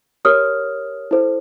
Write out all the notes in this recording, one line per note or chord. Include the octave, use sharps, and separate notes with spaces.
G4 A#4 C#5 D#6 F6
E4 A4 C5